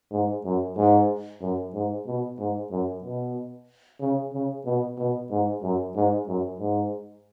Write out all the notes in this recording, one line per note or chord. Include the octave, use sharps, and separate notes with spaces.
G#2
F#2
G#2
F#2
G#2
B2
G#2
F#2
B2
C#3
C#3
B2
B2
G#2
F#2
G#2
F#2
G#2